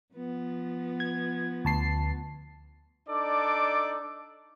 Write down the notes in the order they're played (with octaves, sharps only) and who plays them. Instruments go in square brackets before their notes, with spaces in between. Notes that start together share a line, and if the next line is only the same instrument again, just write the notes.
[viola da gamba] F3 B3
[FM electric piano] G#6
D2 A5 C7
[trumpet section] D4 D#4 A4 D5 D6